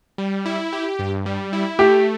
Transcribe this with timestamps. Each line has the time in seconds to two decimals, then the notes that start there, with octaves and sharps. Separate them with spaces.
0.18 G3
0.46 E4
0.73 G4
0.99 G2
1.26 G3
1.53 E4
1.79 A3 G4